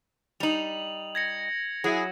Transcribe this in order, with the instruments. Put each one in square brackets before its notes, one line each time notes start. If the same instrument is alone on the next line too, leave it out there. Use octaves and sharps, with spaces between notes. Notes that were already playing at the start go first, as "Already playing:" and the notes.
[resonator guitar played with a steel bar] G3 D#4 [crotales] F7 F#7
[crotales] G#6 A#6 C#7
[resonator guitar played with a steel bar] F#3 [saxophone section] E4 G#4